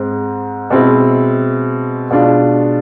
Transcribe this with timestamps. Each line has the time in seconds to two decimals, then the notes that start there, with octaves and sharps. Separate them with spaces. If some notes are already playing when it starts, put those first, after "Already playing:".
Already playing: G#2 G#3 C4
0.70 B2 G#3 C4 E4
2.11 B2 G#3 D4 F4